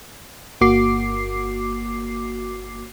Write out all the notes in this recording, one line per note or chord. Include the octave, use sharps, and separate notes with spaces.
G1 A#3 F#4 D6 C7